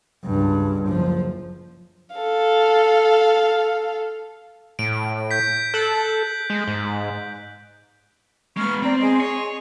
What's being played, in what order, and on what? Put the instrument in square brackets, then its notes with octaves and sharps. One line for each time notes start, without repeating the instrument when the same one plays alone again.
[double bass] C#2 G2
F#1 F3
[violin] A4 F5
[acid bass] A2 [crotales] D7
[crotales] G6 B6
[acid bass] A4 [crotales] F#6 F#7
[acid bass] G#3
G#2
[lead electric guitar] G#3 B3 [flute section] C#6 F6
[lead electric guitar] C4 [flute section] D5 A#5
[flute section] G#4 D#5 C6
[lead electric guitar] C#5